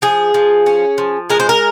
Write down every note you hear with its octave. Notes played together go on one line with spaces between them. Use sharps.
F3 G#4
F3
C#4
F3
G#3 A#4
C5
A#4